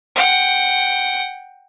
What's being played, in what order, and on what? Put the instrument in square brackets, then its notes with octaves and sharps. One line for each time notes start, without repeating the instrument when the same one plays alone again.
[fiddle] F#5 G5